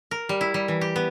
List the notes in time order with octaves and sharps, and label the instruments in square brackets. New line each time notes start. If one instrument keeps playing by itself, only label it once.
[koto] A#4
G3
E4
G3
E3
G4
B3